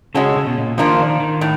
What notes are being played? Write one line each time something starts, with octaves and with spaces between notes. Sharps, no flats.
C#3 G#3 C#4 F#4 A4
C#3
B2
A#2
D#3 F3 A#3 D4 F4
D#3
D#3
A2